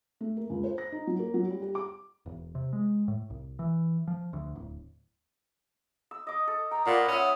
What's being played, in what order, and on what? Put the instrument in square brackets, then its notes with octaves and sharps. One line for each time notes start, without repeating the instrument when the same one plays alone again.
[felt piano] A3
A#3
C#2
C5
A#6
D#4
F#3
A#3
F#3
G3
G4
D6
[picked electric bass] E1
C3
G#3
A2
C2
E3
F3
D2
D1
[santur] E6
D#5 D6
A4
[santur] G5 [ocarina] A#5
[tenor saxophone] A#2 [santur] F4 B4 [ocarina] F#5
[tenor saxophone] C#4 [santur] E5 D#6